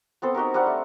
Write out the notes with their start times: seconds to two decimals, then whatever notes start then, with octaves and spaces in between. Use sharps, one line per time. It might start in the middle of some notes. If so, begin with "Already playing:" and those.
0.22 B3 C4 A4 C5
0.34 D#4 F#4 G4 A#4
0.54 G3 C4 D4 F#5
0.66 A3